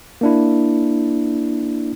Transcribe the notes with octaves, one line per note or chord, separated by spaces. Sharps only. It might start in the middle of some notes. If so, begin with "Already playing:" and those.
A#3 D4 E4